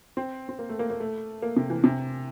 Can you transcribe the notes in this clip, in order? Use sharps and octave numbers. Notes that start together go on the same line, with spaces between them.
C4
C4
A#3
A3
A#3
A#3
A3
A#3
C3
E3
C3